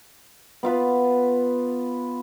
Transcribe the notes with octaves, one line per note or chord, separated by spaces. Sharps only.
B3 F4 B4